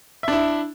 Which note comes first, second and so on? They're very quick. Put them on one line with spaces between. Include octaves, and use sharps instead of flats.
E5 D4 E4